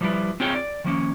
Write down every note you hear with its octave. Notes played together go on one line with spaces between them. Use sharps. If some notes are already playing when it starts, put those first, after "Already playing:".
F3 G3 E4 F4 B4
C4 D#4 F4 G#4 C#5 G5
D5
D#3 F3 A#3 C#4